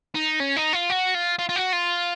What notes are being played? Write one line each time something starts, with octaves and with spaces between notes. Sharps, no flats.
D#4
C#4
D#4
F4
F#4
F4
F4
F4
F#4
F4